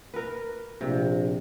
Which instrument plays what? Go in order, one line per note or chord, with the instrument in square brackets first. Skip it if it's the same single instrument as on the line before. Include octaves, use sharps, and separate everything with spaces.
[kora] A#4 B4
[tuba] A#1 [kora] C3